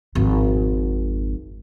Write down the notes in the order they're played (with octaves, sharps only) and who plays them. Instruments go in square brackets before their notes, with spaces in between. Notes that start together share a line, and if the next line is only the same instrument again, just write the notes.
[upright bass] G#1 F2